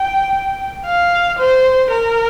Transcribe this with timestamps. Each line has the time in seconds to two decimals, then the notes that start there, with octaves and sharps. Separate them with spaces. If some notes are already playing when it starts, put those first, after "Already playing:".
Already playing: G5
0.85 F5
1.39 C5
1.91 A#4